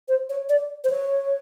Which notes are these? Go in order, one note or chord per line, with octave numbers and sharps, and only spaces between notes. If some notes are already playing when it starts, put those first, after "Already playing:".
C5
C#5
D5
C5
C#5